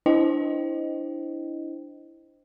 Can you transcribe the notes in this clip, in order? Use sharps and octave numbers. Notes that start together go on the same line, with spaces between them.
D4 E4 C5 D#5 G5